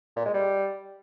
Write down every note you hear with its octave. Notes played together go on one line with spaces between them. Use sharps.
A#2
G#3
G3